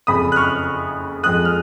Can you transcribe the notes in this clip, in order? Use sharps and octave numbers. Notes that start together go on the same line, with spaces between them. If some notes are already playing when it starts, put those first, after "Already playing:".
F#1 F2 C#3 B5 D#6
F#6
C#6 F6
F2 F3 G#3 D#6 F#6
F6